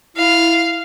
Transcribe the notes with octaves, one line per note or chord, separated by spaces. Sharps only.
E4 F5